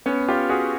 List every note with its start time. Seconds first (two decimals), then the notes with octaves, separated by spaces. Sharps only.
0.06 B3 C#4
0.28 F4 G4
0.49 F#4 G#4